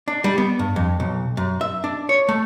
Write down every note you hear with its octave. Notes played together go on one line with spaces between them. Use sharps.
D4
G3
B3
G2
F2
B1
F#2
E5
D4
C#5
A3